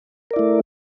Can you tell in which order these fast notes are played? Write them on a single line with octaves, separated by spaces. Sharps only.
A#4 D5 E4 A3